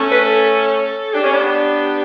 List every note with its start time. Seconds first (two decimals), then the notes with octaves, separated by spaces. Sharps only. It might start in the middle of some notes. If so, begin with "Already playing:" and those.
Already playing: A3 C#4
0.11 B4
0.24 A4
1.14 D4 G4
1.24 C#4
1.33 B3 D4